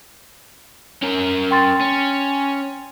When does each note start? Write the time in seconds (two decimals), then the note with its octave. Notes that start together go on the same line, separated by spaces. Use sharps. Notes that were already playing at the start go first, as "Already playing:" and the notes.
1.03 C#4 A#4
1.51 G5 C6 A6
1.80 C#4